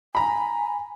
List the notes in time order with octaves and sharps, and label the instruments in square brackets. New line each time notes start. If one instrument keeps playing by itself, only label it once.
[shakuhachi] G#5 [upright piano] A#5 B5